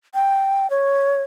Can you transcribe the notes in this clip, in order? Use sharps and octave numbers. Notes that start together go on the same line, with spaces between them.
G5
C#5